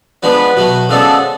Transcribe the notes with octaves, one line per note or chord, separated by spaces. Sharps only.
F3 G#3 B3 D4 B4
B2 F#3 A3
C#3 F3 G#3 B3 D4 A4